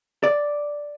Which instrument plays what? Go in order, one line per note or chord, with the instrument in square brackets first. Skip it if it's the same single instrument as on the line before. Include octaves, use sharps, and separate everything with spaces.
[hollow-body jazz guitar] D5